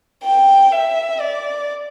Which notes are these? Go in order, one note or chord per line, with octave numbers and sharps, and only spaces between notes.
G5
E5
D5